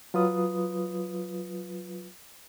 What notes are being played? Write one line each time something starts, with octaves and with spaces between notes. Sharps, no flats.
F#3 F4 B4 D#6